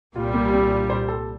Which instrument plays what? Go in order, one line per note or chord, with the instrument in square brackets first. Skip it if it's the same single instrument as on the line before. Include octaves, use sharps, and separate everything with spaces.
[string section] C2 A#2 G3 [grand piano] F4
[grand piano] A#3
C4
D4
C5
A4